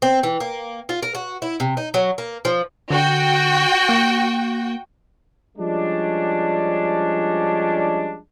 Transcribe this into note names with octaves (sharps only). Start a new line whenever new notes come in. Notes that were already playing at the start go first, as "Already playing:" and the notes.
C4
E3
A#3
F4
A#4
F#4
E4
C3
D#4
F#3
A#3
F3
D3 F#4 G5
A#3
F3 G3 G#3 C#4 D4